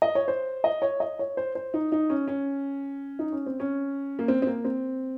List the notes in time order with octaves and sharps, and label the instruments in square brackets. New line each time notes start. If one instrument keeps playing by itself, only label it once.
[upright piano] D#5
C#5
C5
D#5
C#5
D#5
C#5
C5
C5
D#4
D#4
C#4
C#4
D#4
C#4
C4
C#4
A#3
C4
C4
A#3
C4